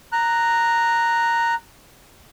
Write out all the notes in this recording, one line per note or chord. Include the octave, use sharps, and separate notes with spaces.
A#5 F#6